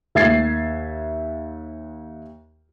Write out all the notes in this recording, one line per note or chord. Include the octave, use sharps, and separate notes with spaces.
D#2 E5 G#6 A6 C7